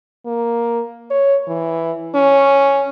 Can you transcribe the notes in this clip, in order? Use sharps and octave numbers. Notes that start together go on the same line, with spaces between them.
A#3
C#5
E3
C#4